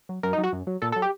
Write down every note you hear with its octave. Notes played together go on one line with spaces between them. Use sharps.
F#3
F#2 A#4
D#4
F#3
F#4
F#2
F#3
A#2 A4
F#3 A4
G4